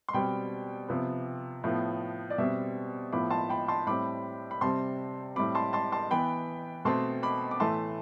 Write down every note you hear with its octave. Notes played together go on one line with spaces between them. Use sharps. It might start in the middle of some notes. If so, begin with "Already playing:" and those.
C6
B2 G3 C4 G5 B5
C3 F3 B3
A2 F3 B3
D5
B2 G3 C4 E5
A2 F3 B3 B5 D6
A5 C6
G5 B5
A5 C6
A2 G3 C4 B5 D6
B5
C3 G3 C4 A5 C6
A2 G3 C4 B5 D6
A5 C6
A5 C6
A5 C6
E3 B3 G5 B5
B2 A3 C4 A5 C6
B5 D6
D6
A2 E3 A3 A5 C6